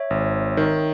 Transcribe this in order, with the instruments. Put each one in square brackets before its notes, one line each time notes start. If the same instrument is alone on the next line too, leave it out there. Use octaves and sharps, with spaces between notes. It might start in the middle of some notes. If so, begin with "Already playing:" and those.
Already playing: [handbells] C#5 E5
[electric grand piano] G#1
D#3